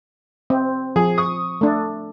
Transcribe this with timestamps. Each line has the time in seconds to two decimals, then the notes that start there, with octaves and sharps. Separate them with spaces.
0.50 C4
0.96 F3 G#4
1.18 C#6 D#6
1.61 A3 D4